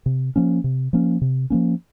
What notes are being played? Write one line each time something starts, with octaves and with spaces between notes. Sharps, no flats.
C3
F3 A#3 C#4
C3
F3 A#3 C#4
C3
F3 A#3 C#4